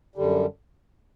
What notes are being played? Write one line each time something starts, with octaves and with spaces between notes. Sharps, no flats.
F#2 D3 G3